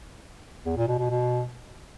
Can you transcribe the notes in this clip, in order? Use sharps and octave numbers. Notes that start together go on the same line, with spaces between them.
E2
A#2
B2
B2
B2